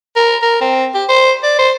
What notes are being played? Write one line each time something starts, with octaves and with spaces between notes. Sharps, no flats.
A#4
A#4
C4
G4
C5
D5
C5